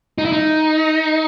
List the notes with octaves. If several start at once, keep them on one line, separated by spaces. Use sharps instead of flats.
D#4
E4
D#4